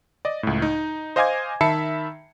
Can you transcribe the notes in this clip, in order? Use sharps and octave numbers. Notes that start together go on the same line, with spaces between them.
D5 D#5
C#2 A2
D#4
C5 D#5 F5 G#5 D6 G#6
D#3 E5 A5 B5 C7 C#7